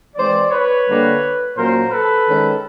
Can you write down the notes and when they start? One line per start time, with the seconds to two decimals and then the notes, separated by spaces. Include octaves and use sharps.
0.15 E3 G#3 C4 C5 D5
0.51 B4 C#5
0.87 D3 G3 A#3
1.56 A#2 F#3 A#3 C#4 A#4 C5
1.92 A4 B4
2.27 D#3 G#3 C#4